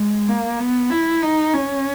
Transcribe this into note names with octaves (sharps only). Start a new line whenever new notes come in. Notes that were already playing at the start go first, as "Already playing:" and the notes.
Already playing: G#3
A#3
B3
E4
D#4
C#4